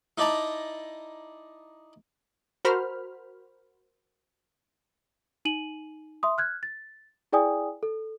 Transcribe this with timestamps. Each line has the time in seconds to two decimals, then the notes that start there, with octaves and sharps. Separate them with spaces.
0.18 D#4 E4 D5 A5 A#5
2.65 F#4 A#4 C5 B5 F6
5.45 D#4 D#7 F#7
6.23 E5 C6 D#6
6.38 F6 F#6 G#6
6.63 A6
7.33 E4 G#4 D5 G5 G#5 D#6
7.83 A4